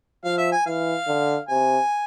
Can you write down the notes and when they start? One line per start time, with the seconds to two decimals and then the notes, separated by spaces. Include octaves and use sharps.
0.24 F3 F5
0.38 E5
0.52 G#5
0.66 E3 F5
1.08 D3
1.49 C3 G#5